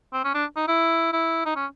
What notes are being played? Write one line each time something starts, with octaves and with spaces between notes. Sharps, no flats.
C4
C#4
D4
D#4
E4
E4
D#4
C#4